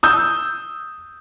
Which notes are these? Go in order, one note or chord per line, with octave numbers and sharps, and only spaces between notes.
D#6 E6 G6